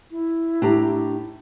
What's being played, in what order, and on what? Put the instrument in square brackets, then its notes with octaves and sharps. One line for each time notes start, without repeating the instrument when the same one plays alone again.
[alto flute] E4
[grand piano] A2 [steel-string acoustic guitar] D4 G4 A#5